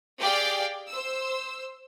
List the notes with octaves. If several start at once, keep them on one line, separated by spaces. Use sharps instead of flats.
G4 G#4 D5 F5 G5
C5 E6